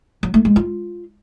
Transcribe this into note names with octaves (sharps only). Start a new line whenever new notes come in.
F#3
A3
G#3
F4